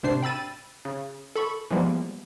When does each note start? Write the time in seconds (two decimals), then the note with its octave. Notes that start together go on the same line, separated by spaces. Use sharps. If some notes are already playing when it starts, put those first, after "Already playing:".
0.03 G#1 C3 D4 C5 C7
0.23 G5 B5 E6 A6 D#7
0.85 C#3
1.36 A4 B5 C#6
1.71 E3 F3 G3 G#3 A#3 B3